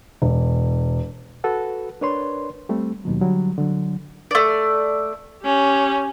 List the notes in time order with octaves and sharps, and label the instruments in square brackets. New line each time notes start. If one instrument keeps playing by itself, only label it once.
[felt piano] E1
[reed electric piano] F#4 A4 B4 F#5
D4 A#4 B4 C#5 D5 C6
G3 A3 C4
D#2 B2 F#3
D3 F#3 G3
D3 F#3
[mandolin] A3 D5
[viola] C#4 G4